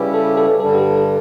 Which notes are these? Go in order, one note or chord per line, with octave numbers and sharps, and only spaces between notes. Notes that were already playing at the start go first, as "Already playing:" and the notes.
Already playing: C#3 G3 C#4 E4 G4 B4
A4
A4
G2 D3 G3 D4 A4
G4
A4
A4